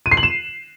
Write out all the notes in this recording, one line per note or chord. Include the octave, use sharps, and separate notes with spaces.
D#7
C7
F#7
E7